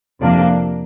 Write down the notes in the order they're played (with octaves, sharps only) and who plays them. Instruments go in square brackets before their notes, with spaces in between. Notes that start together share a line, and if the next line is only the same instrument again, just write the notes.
[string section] F2 C3 F3 A#3 D4